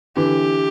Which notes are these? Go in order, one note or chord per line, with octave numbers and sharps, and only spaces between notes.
D3 E3 G4